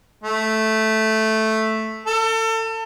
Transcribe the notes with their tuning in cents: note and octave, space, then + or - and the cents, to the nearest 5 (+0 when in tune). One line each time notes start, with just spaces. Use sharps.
A3 -5
A4 +35